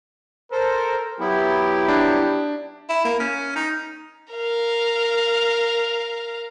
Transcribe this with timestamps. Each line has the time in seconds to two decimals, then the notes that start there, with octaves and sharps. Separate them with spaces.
0.52 A4 A#4 C5
1.19 F#3 B3 E4 G4
1.88 D4
2.89 E4
3.05 A#3
3.20 C#4
3.56 D#4
4.32 A#4 F5